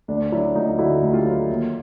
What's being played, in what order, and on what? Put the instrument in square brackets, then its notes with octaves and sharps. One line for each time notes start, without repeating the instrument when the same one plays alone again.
[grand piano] D2 D4
F#3 D4 E4
D2 D#4 F4
D3 E4 F#4
D2
F4 G4
F#3
D#2